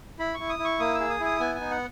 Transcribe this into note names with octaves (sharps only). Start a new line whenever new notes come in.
E4 B5
E4 C#6
D#6
E4
C#6
A#3 D#6
E6
G#4
D#6
E4
D#6
B3 G#5
G#5
D#4
F#5